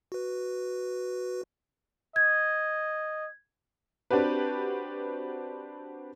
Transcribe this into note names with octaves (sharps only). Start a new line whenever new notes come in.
F#4 B4
D#5 G#6
C4 D4 F#4 G4 B4